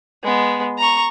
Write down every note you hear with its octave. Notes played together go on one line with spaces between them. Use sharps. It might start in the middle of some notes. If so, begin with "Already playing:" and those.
G#3 B3
A#5 C#6